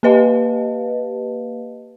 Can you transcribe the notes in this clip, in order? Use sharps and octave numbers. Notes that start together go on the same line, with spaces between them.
A#3 G4 B4 D#5 F5 A5